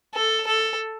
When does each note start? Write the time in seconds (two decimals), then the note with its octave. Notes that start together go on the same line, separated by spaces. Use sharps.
0.15 A4
0.47 A4